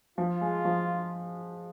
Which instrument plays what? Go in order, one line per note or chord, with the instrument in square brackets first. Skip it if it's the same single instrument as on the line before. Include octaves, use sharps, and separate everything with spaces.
[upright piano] F3 [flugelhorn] F4
[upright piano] G#3
F3